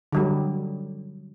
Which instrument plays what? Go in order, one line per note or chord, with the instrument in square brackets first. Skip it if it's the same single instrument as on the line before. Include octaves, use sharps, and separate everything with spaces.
[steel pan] D3 F#3 G3